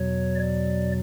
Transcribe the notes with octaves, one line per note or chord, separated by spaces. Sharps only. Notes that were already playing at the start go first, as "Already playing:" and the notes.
Already playing: E2 B2 F#3 C#5
D5